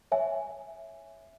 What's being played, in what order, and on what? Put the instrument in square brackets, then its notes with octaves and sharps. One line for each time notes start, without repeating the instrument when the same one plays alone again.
[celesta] C#5 E5 G#5